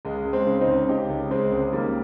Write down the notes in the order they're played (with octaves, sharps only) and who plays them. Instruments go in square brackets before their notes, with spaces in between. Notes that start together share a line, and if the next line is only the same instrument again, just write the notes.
[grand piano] C#2 G#3
C#2
G#3 C4
C#3
C4 D#4
C#2
C#3 D#4 G4
C#2
C#3 G#3 C4
C#2
D#3 G3 A#3